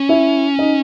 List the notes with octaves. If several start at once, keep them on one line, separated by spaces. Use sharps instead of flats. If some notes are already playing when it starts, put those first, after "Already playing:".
Already playing: C#4
E4 E5
D#4 D#5